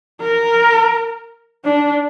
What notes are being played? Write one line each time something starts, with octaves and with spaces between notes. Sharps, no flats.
A#4
D4